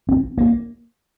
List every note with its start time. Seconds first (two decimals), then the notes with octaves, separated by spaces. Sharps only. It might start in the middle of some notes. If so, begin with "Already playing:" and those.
0.09 C4
0.38 A#3